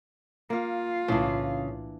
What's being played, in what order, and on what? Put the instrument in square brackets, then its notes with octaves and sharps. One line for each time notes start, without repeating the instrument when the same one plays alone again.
[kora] A#3 F5 [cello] F4
[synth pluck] B1 A2 [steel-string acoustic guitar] C#3 [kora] E3 D4